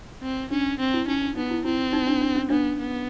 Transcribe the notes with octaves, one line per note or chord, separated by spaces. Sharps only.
C4
C#4 D4
C4
E4
C#4 D#4
D4
B3 D#4
E4
C4 E4
D#4
D4
D4
C#4
B3 D4
B3